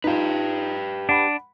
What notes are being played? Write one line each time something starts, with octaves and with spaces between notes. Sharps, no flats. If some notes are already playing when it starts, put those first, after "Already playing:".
D#4 F4 G4 B4
D4 F#5 B5